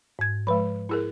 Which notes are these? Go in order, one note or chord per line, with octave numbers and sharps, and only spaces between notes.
G#2 G#6
F3 G#3 B4 B5
E4 G#4 A#4